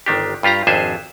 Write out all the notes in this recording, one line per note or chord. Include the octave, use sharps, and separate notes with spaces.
G1 D#3 D4 G4
G2 F4 G4 F5 A#5
G#1 F2 D4 G#4 C5 E5